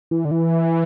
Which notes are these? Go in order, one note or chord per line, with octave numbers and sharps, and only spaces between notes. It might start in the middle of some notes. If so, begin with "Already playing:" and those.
E3
D3
E3